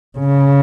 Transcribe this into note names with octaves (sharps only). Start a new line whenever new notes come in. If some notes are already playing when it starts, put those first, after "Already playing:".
C#3